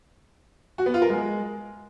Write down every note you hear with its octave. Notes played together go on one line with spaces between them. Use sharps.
F#4
B3
F4
A#4
G#3